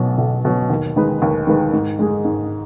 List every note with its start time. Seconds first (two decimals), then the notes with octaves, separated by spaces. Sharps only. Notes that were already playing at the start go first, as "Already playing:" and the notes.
Already playing: B1 B2 F#3
0.18 B1
0.45 B2 F#3
0.70 D#2
0.96 D#3 G#3 D#4 B4
1.22 D#2
1.47 D#3 G#3 D#4 B4
1.73 G#2
1.99 G#3 D#4 G#4
2.25 G#2